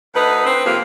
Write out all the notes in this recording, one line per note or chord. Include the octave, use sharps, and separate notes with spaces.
D2 D#4 B4
C4
F2 C3 A#3